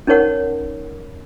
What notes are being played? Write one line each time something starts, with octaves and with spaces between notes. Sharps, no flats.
C#4 D#4 A#4 C#5 F#5